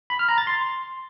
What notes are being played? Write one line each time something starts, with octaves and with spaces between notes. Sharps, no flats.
B5
F6
A#5
A6
C6